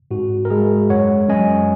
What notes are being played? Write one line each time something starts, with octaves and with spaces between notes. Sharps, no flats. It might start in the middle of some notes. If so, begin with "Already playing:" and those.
G#2 F#4
A#4
G#3 G#4
F#2 C#5 F#5
F#2 D#5 G#5